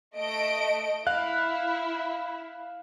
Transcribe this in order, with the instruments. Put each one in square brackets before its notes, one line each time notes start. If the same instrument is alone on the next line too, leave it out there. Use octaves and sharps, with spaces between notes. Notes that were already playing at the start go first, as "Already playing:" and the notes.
[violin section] A3 D#5 D7
[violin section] E4 [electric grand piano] F5 F#6